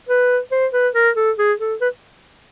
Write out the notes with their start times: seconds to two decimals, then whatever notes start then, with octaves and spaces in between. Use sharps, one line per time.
0.09 B4
0.52 C5
0.73 B4
0.95 A#4
1.16 A4
1.38 G#4
1.60 A4
1.81 B4